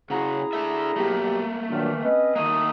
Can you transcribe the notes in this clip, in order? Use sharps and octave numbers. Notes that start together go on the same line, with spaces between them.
C#3 E4 F#4 G#4 A#5
D4 A4 E5
B2 F#3 A3 A#3 G4
A#2 D#3 E3 F#3 D4
C4 C#4 B4 D#5
D#3 A3 A#3 D#6